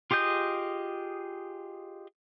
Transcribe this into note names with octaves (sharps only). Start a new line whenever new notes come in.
F4 G4 G#4 D#5 G6